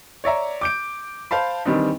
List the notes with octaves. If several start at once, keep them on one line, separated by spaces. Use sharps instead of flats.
C#5 D5 E5 A#5
D6 G6 D7
C5 F5 A5 B5
D#3 E3 G3 C4 D4 D#4